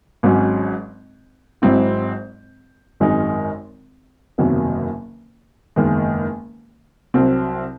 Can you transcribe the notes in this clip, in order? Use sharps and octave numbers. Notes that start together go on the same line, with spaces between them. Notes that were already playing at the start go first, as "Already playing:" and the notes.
G#1 G#2 F#3 C#4
G#1 G#2 F#3 C4 E4
G#1 F#2 D#3 G#3 D#4
F#1 E2 C3 D#3 F#3
F#1 E2 D#3 G#3
C2 C3 F#3 C4